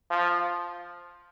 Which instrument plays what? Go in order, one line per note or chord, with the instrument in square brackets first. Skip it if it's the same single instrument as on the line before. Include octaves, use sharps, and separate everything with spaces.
[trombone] F3